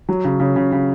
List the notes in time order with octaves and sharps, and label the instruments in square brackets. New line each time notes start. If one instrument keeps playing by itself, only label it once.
[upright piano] F#3
C#3
C#3
C#3
C#3